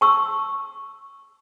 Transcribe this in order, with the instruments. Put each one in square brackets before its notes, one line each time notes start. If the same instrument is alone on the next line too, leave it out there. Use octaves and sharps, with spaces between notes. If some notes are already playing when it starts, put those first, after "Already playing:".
[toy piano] A5 C#6 E6